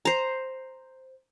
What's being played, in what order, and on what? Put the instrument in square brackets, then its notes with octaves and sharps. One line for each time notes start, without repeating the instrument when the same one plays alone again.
[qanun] C5 A#5